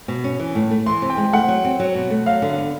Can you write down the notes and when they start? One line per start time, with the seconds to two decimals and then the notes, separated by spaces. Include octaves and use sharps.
0.08 B2
0.24 C#4
0.39 E3
0.55 A2
0.70 A3
0.86 E3 C6
1.02 C3
1.10 G5
1.17 G#3
1.33 A3 F#5
1.48 F#3
1.64 C4
1.80 F#3
1.95 B2
2.10 A3
2.26 F#3 F5
2.42 D3
2.50 F5
2.58 B3